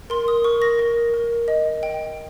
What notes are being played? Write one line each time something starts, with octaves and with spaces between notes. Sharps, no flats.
A#4 C6
D#6
A#4 C#6
A#6
A#4
A#4
D#5
G5